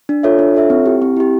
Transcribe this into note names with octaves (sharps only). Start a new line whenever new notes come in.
D4
F4 A4 C#5 E5
D4
F4 A4 C#5 E5
C4
E4 G4
C4
E4 G4